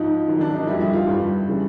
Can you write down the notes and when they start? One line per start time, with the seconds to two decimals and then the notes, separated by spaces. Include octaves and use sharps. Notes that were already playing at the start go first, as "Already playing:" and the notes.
Already playing: G#2 F3 D#4
0.28 G#2 D#3 F#3
0.41 D4
0.54 D#4
0.67 F2 D3 G3 E4
0.80 E4
0.93 F4
1.07 G2 E3 G3
1.47 C#3 E3 G3